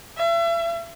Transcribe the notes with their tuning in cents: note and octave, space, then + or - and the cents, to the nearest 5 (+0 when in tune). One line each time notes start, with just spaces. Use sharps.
E5 +40